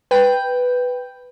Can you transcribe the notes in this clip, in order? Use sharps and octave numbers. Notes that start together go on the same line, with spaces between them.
B4 G5